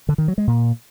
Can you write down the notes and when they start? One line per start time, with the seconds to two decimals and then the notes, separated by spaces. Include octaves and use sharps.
0.09 D3
0.18 D#3
0.28 F#3
0.38 G#3
0.47 A#2